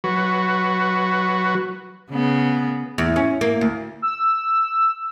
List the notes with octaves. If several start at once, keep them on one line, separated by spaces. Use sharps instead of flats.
F#3 F#4 B4
C#3 B3
E2
C#4
A#3
D2
E6